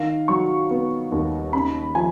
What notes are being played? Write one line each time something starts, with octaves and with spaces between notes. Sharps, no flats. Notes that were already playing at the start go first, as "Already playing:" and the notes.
Already playing: D#3 F5
F#3 C#6
B3
D#2
C#3 B5
F3 G#5